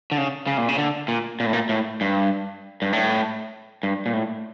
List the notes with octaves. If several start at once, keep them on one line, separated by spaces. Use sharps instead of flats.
D3
C#3
C#3
A#2
C#3
D3
A#2
A#2
A2
A#2
A2
G2
G2
A2
G2
A#2
A2